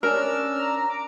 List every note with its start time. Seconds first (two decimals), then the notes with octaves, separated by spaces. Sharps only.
0.03 C#4 D4 A#4 E6 F6
0.59 A#5
0.90 D6